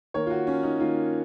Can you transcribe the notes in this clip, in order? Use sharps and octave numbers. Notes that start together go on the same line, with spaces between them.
D#3 A#3 C#5
F4
F#4
C#4
D#4
D#3 A#3 F4